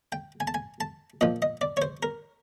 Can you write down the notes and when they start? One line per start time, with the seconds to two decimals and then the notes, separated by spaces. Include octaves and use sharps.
0.12 G5
0.40 G#5
0.47 A5
0.54 G#5
0.81 A5
1.21 A#2 F3 D#5
1.42 D#5
1.61 D5
1.77 C#5
1.82 C5
2.03 A#4